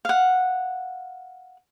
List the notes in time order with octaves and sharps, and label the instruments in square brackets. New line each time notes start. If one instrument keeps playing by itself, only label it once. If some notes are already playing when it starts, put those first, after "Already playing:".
[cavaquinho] F5 F#5